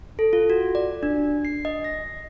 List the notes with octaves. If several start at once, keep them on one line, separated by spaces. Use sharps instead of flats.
A4
F4
F#4
D5
D4
C7
D#5
A#6